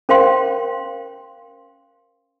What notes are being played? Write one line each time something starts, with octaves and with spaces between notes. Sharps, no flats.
C#4 A#4 C5 F5 G5 C6